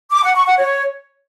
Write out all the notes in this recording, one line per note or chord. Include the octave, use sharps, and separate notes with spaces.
D6
F#5
C#6
F#5
C#5